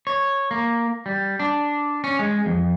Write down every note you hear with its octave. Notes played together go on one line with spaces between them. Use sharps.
C#5
A#3
G3
D4
C#4
G#3
F2